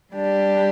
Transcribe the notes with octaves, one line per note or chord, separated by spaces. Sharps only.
G3 D4 G4